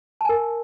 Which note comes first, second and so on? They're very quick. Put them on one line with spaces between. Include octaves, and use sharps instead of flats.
A5 G#5 A#4